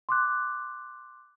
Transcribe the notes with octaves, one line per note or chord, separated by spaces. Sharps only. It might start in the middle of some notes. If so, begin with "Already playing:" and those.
C6 D6 F#6